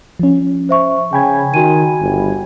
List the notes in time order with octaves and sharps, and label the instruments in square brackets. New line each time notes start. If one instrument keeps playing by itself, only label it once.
[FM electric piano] F3 C#4
[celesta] C5 E5 C#6
[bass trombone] C#3 [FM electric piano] G5 B5 G#6 [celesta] G#5
[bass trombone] D#3 [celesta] F#4 G#5 D#7
[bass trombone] G1